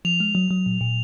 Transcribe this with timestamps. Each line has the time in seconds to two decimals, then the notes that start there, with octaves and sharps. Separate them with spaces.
0.05 F3 F7
0.20 G#3
0.35 F#3
0.51 F#3
0.66 A#2
0.81 A#2